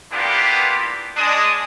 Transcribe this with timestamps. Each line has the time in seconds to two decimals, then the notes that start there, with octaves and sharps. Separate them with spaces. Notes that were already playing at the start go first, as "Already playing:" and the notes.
0.11 A#3 B3 D4 E4 F4 G4
1.17 G#3 D4 D#6